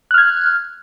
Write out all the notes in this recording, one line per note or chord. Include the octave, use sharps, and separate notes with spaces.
F6 F#6 G#6